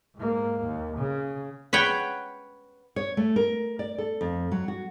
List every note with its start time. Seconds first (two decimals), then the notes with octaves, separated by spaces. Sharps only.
0.15 G#2 A#3
0.65 D#2
0.97 C#3
1.73 B4 C#5 F#5 G5
2.96 C#5
3.17 A3
3.36 A#4
3.79 D5
3.98 A4
4.21 F2
4.51 F#3
4.68 F#4